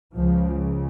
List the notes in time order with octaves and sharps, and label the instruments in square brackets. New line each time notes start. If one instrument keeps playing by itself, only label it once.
[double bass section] C#2 C#3 F3